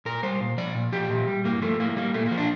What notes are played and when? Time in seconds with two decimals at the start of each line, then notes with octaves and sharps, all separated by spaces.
0.05 A#2 A#4
0.23 G3 C5
0.41 A#2
0.58 F3 D5
0.75 A#2
0.92 F3 G4
1.10 A#2
1.28 G3
1.45 G2 A#3
1.62 F3 A3
1.80 A2 A#3
1.96 G3 A#3
2.14 A#2 A3
2.26 A#3
2.31 F3
2.38 D4